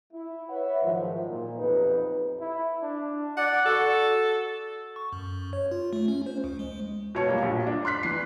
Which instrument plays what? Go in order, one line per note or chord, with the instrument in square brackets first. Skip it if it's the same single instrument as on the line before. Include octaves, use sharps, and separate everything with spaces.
[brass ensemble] E4
B4 C#5 E5 F#5
G#2 D#3 F3 F#3
A#2
B1 F2 D#4 G4 B4
[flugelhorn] E4
D4
[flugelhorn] D5 [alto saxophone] F#5
[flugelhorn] F#4 [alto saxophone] A4
[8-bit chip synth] C#6
F#2
C#5
F4
A3
C#4
C5
D2
G#3
[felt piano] B2 C#5 A5
F#3 G3 A#3
A#1
D4
C6 F6 F#6 B6
E3 C7